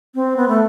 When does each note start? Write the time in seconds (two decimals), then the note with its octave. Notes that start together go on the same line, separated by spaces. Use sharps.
0.15 C4
0.37 B3
0.48 A3